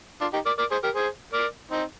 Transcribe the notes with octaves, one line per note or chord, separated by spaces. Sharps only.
D4 F4
D#4 G4
A#4 D5
A#4 D5
G#4 C5
G4 A#4
G#4 C5
A#4 D5
C4 D#4